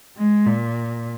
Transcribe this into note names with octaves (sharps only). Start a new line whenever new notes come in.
G#3
A#2